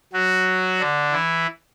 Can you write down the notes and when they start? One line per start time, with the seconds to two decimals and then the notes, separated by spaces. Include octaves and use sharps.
0.13 F#3 F#4
0.80 D3 D4
1.12 E3 E4